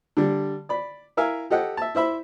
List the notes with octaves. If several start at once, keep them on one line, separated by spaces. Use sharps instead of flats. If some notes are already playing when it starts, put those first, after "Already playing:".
D3 G3
D5 B5
E4 A#4 E5 F5 G#5
G4 A4 D#5 F#5 G5
E5 A5
E4 C5 E5 B5